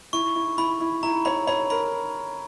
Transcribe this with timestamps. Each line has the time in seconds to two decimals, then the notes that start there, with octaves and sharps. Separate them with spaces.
0.13 E4 C#6
0.35 E4
0.57 E4 B5
0.80 E4
1.03 E4 A#5
1.25 C#5 B5
1.47 C#5 B5
1.70 A#4 B5